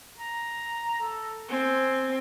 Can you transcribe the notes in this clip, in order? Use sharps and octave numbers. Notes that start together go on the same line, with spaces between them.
A#5
A4
C4 G#5